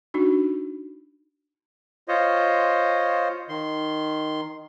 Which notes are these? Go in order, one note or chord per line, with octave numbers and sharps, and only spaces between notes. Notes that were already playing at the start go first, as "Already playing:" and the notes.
D4 D#4 F#4
F4 C5 C#5 D#5
D#3 C6